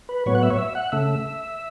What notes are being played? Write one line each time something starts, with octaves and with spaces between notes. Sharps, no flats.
B4
A2 F#3 B3 C#5
F#5
E5
C#5
E5
F#5
C#3 A3 E5